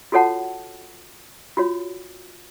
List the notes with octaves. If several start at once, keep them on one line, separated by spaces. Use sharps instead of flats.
F4 F#4 A4 C#5 F#5 A5
F4 F#4 C#5